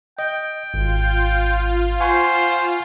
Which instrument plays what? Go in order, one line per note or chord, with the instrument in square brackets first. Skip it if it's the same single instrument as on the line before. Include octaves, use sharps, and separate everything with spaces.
[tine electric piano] D#5 [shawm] G5
[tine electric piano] G#1 [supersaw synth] F4
[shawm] C5 [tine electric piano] F#5 G#5 C#6